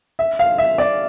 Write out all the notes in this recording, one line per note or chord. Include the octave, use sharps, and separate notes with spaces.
E5
F5
E5
D5